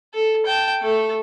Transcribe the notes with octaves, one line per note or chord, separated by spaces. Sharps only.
A4
G5 A5
A3 A4